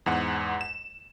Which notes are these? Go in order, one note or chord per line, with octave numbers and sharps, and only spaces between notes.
E2 G#2 F#5
E7